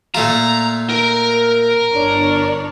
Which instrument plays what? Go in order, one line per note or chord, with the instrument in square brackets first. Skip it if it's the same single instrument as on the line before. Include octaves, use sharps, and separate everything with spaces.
[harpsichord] A#2 A3 F4 [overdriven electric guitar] A#5
[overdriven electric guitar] A#4
[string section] G1 D4 C#5